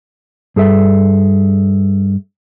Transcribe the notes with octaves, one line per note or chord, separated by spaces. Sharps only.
G2 G#4 A4 E5